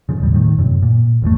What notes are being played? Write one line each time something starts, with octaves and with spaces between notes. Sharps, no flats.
C#3 F3
A1 D#2 G3
A2 D#3
F#2 C3
A#2
G#1 E2 D#3 A3